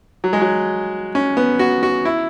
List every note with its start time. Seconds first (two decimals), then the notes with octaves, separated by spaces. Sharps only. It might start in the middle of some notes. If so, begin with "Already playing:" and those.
0.24 F#3
0.33 G#3
0.41 F#3
1.15 C#4
1.37 B3
1.59 F#4
1.83 F#4
2.05 E4